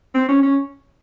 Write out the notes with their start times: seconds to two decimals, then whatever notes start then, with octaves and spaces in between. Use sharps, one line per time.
0.14 C4
0.29 C#4
0.43 C#4